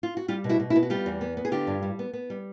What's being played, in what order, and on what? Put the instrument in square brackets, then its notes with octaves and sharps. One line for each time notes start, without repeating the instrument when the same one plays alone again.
[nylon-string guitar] F4
F#4
G3 F4 G4
B2
E4 F#4
B2
E4 F#4
B3
F#4
G3 F4 G4
E2
B3
B3
G#4
D3 F4 G4
G2
G3
B3
B3
G3